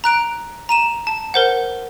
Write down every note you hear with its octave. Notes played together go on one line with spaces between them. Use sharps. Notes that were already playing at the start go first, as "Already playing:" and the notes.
A#5 F#6 D7
A#5 D#7 E7
A5
A#4 C5 F#5